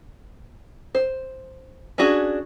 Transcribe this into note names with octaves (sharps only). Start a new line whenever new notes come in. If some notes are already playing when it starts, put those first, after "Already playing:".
C5
C#4 D4 F#4 G#4